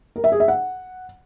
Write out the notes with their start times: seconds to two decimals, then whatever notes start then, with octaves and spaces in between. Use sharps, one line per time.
0.16 A#4
0.24 E5
0.32 G#4
0.40 E5
0.48 F#5